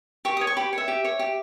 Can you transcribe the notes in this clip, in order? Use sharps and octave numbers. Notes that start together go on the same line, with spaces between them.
G4 C#6
D#6
C#5
C#6
G4 B5
C#5 E5
G4
C#5
G4